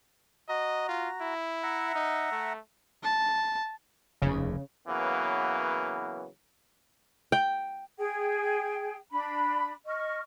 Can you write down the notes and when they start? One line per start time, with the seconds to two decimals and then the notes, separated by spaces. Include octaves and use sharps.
0.49 F#4 D#5 A#5
0.89 F4
1.21 E4
1.63 E5 F#5 A#5
1.95 D#4
2.32 A3
3.03 A5
4.22 F1 D#2 C#3
4.88 C#3 E3 F#3 A#3 B3
7.32 G5
7.97 G#4 G5
9.11 D4 B5
9.86 D#5 C#6 F6